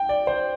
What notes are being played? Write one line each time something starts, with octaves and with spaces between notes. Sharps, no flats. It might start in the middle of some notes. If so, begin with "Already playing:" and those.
Already playing: G5
D5
C5